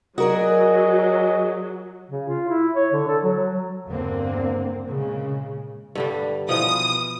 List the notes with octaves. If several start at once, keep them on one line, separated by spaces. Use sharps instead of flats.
F#3 F#4 G#4 A#4 D5 D#5
C#3
F4
E4
C#5
D3
A4
F#3
F#3
E2 G2 D3 A#3 C4
A#2 C#3 G#3
G2 D3 G3
B2 E3 F3 D#6